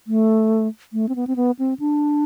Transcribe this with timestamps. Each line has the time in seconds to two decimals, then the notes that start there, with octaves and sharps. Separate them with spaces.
0.07 A3
0.93 A3
1.09 C4
1.16 B3
1.27 C4
1.36 B3
1.59 C4
1.80 D4